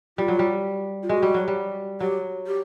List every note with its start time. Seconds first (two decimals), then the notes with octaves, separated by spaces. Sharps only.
0.18 G3 F4
0.28 F#3
0.39 G3
1.03 F4
1.09 G#3 F#4
1.22 G3
1.34 F#3
1.48 G3
2.00 F#3 G4
2.47 G4